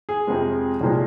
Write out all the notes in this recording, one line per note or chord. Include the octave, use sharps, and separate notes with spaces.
G#4
F2 C3 F3 G#3
C2 A#2 F3 G#3